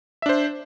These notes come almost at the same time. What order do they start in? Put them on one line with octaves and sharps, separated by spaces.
E5 D4 C5